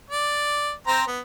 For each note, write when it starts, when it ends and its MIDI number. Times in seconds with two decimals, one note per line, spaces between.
0.10 0.72 74
0.87 1.03 60
0.87 1.03 72
0.87 1.03 82
1.07 1.20 59